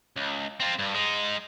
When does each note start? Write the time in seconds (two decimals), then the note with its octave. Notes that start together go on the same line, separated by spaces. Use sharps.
0.17 C#2
0.60 C4 F4
0.79 G2
0.94 G#3 D#4